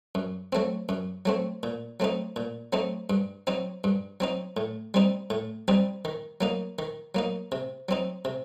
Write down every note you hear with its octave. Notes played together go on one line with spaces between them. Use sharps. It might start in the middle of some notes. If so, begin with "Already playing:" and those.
F#2
F#3 A3 C4
F#2
F#3 A3 C4
A#2
F#3 A3 C4 D#4
A#2
F#3 A3 C4 D#4
G2
F#3 C4 D#4
G2
F#3 C4 D#4
A2
G3 C4 D#4
A2
G3 C4 D#4
D#3
F#3 A#3 D#4
D#3
F#3 A#3 D#4
C3
F#3 C4 D#4
C3